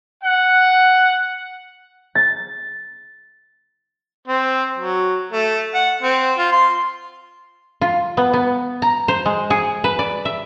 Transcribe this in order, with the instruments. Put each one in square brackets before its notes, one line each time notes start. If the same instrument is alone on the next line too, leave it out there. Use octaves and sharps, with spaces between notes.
[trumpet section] F#5
[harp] A6
[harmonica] C4
F#3
A3
F#5
C4
F4
C6
[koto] F4
B3
B3
A#5
C5
G#3
G#4
B4
D5
E5